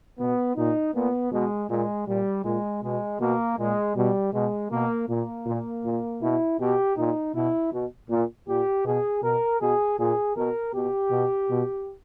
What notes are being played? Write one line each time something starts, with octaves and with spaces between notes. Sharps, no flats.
B2 B3
A#2 D#4
A#2 B3
B2 G#3
A#2 G#3
A#2 G3
A#2 G#3
B2 G#3
B2 A#3
A#2 G#3
B2 G3
B2 G#3
B2 A#3
A#2 A#3
A#2
A#2
B2 E4
B2 G4
A#2 D#4
B2 E4
B2
A#2
A#2 G4
B2 G#4
B2 A#4
B2 G#4
A#2 G#4
B2 A#4
B2 G4
B2
B2